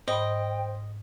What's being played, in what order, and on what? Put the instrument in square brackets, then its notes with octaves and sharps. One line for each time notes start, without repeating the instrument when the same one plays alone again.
[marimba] G#2 B5 [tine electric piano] C5 [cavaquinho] D#5 [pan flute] G5